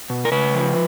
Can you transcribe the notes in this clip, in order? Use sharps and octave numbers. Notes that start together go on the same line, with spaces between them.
B2
A#4
C#3 B4
F3